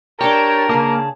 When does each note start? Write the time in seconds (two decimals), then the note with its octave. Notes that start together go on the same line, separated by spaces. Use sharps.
0.21 D4 G4 A#4 C#5 G5 A5
0.69 C#3 A#3 G#4 A5